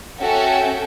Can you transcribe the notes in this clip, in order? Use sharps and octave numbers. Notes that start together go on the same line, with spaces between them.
C#4 F#4 A4 E5 G5